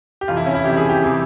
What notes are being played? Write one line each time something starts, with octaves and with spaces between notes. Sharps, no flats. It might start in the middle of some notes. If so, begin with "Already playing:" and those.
G4
F2 C3 E3 F4
E4
C#4
E4
F2 C3 E3 G4
G#4
G4
C3 E3